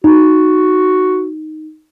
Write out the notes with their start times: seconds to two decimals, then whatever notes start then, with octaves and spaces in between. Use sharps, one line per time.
0.04 D#4 F#4